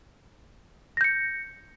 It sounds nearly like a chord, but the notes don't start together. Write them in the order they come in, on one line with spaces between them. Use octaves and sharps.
A#6 G6 C#7